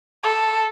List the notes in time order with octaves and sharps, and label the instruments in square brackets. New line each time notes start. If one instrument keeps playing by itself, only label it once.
[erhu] A4